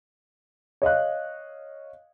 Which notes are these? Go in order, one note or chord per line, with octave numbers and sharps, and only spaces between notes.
C#5 D#5 F5 F#6